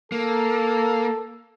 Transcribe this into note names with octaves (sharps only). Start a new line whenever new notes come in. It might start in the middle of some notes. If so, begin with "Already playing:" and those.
A#3 A4